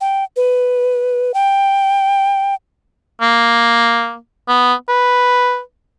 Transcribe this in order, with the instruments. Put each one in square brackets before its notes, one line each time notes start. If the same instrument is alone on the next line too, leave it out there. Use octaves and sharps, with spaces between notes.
[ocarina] G5
B4
G5
[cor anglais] A#3
B3
B4